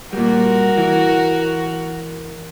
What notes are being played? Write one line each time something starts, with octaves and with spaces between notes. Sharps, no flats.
A#2 G3 F#4 A#4
E3